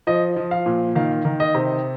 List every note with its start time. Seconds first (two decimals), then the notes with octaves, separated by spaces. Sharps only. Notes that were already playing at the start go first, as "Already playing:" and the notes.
0.07 F3 D#5
0.36 F3
0.51 F5
0.66 A#2
0.95 D#3 F5
1.25 D#3
1.40 D#5
1.55 C3